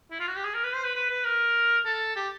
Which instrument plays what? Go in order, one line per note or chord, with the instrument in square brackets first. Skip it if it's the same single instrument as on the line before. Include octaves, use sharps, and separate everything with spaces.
[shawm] E4
F4
F#4
G4
G#4
A#4
B4
C5
B4
B4
B4
A#4
A4
G4